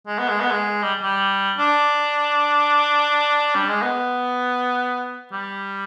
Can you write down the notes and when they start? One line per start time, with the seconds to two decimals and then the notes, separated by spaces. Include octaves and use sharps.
0.07 G#3
0.18 B3
0.29 G#3
0.40 B3
0.51 G#3
0.83 G3
1.02 G3
1.58 D4
3.55 G3
3.68 G#3
3.82 B3
5.32 G3